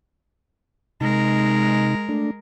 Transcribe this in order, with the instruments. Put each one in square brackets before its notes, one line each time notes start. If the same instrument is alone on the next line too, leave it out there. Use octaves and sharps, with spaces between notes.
[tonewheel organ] C3 D#4 [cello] G#3 A#4
[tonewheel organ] A3 D4